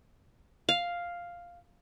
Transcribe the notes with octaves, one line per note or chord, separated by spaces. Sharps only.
F5